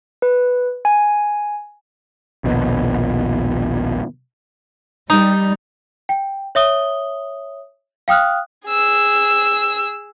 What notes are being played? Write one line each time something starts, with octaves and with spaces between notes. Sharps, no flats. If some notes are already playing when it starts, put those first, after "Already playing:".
B4
G#5
A#1 D#2 B2
G3 D#4
G5
C#5 E5 D#6 G7
F5 G5 D#6 F6 F#6
G#4 E6